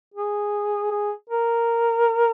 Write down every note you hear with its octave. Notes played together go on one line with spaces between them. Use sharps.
G#4
G#4
A#4